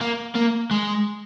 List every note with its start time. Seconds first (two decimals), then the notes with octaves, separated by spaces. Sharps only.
0.01 A#3
0.35 A#3
0.71 G#3